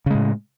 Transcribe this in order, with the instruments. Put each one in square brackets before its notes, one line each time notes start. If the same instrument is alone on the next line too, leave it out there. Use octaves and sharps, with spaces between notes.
[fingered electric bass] C#3
G#3
A2